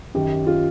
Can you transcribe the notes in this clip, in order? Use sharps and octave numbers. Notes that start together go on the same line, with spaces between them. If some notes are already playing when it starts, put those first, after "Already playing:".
F#2 D#3 F#3 G4
F4